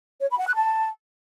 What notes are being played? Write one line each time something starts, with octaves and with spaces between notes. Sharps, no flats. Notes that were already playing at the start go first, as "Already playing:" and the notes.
C#5
B5
F#5
F#6
A5